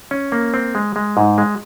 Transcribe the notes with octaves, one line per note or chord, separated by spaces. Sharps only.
C#4
A#3
C4
G#3
G#3
G#2
G#3